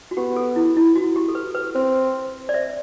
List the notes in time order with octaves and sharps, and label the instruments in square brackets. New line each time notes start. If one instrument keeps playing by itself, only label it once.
[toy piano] F#4
[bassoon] B3 [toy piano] G4
[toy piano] A4
E4
E4
F#4
G4
A4
B4
B4
[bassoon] C4 [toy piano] C5
[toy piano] D5
C5 E5